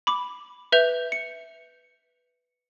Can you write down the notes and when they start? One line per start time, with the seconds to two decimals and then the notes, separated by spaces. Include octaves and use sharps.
0.07 B5 D6
0.72 B4 E5 G6 F7
1.12 C#7